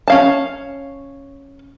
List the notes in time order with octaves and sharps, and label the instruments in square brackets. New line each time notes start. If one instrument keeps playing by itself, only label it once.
[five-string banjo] C#4 F5 A5